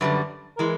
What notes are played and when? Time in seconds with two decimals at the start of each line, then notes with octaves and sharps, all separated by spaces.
0.01 F#2 D3 G3 B4
0.57 E3 G#3 A#4